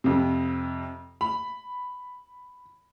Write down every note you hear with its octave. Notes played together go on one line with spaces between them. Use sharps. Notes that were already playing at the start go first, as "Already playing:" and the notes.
F2 C3
B5